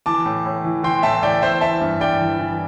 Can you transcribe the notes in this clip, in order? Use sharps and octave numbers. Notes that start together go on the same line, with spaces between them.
E3 A5 D6
A2
A2
E3
E3 G5 C6
A2 E5 A5
A2 D5 G5
E3 C5 E5
E3 E5 A5
G2
G2 D5 G5
E3
E3